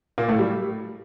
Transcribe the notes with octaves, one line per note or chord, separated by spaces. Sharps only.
A#2 A#3
A2 A3
G3